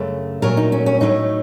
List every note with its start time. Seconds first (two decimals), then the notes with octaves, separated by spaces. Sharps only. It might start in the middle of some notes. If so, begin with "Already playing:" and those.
Already playing: F#2 C#3 A3
0.42 A#2 F#3 A3 A#4
0.57 D#4
0.72 C#4
0.86 C#4
1.00 A2 F#3 A3 C#4 D#4